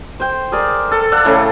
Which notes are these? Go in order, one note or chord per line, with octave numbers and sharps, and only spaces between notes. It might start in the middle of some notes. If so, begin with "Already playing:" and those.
C5 G5
G#4 A#4 D5
A4
A4 D5 F5 F#5
A2 C#3 A4 F#5